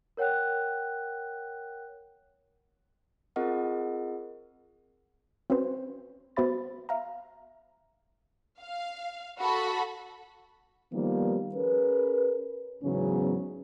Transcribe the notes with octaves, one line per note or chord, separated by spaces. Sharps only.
A#4 C#5 F#5 G5 F#6
C4 F4 G#4 A#4 D#5 F#5
C4 C#4 F#4 B4 C5
B3 F#4 C5 E5 B5 A6
E5 F5 A#5
F5
F#4 A4 B5
D#3 F3 G3 A#3 B3
C#4 G#4 A#4 B4
E2 G#2 C#3 F#3 B3 C#4